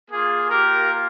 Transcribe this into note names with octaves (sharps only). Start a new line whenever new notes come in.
A#3 F4 G#4
G4 A#4